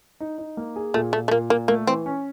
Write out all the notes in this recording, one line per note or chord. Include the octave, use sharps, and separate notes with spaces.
D#4
D#4
A#3
G#4
A#2 A3
A#2 A3
A3
A#2 A#3
A#2 A#3
A3 A#3
E3 C4
C#4